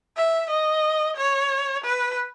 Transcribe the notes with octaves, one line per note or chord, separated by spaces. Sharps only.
E5
D#5
C#5
B4